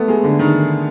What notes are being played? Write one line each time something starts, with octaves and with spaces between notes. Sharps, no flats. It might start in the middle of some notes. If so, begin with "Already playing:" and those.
Already playing: A3 B3
G#3
D3
D#3